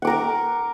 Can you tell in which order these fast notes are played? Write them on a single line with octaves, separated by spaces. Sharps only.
F#5 D6 A#4 A#5